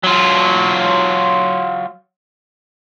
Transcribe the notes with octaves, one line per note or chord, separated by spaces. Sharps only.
F#3 F4